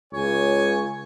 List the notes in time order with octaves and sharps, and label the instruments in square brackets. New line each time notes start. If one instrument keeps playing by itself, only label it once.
[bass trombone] C#2 [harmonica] C#5 G#5